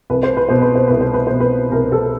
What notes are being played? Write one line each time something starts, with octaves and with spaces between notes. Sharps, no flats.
C2 B4
C5
B4
B2 C5
B4
C5
C2 B4
C5
B4
B2 C5
B4
C2 A#4
A4